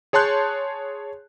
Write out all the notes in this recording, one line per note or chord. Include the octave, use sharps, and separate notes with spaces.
G#4 C#5 A5 C6 F#6 G6